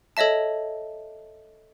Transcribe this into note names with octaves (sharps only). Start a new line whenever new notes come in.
A4 C#5 D#5 E5 A5